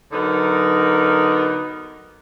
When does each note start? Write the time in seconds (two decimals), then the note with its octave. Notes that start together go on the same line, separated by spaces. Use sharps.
0.12 D3 F#3 B3 D#4 A#4